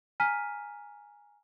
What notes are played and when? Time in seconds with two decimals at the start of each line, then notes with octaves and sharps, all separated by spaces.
0.20 G#5 A#5 F6 B6 D#7